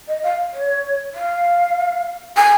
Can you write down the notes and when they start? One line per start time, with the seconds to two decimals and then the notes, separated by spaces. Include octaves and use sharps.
0.08 D#5
0.23 F5
0.53 C#5
1.15 F5
2.37 G#5